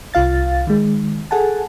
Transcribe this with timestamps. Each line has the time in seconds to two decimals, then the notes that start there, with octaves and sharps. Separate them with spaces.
0.14 C2 F4 F5 A6
0.67 D#3 G#3
1.31 G#4 A4 F#5 G#5 A5